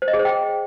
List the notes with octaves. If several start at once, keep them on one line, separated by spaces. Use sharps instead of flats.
C5
D#5
G#4
C5
G5